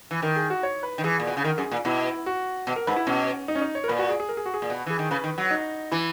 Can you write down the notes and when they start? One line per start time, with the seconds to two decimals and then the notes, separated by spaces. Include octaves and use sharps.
0.11 E3
0.22 D#3 A#4
0.36 G#4
0.50 F#4
0.63 C#5
0.83 B4
0.98 D#3
1.04 E3 G#4
1.20 A#2
1.27 B2
1.37 C#3
1.44 D#3 A#4
1.58 F#2 G#4
1.71 A#2
1.85 B2 E4
2.26 F#4
2.67 B2
2.76 A#4
2.87 G#2 B4
2.96 E4
3.07 B2 C#4
3.48 D#4
3.55 C#4
3.62 D#4
3.75 C#5
3.84 A#4
3.88 A#2 B4
3.99 F#4
4.09 G#4
4.20 G#4
4.29 A#4
4.37 G#4
4.46 F#4
4.54 G#4
4.62 A#2
4.70 B2
4.86 E3 G#4
4.99 D#3
5.11 C#3 B4
5.24 D#3
5.38 F#3
5.51 D#4
5.92 E3 E4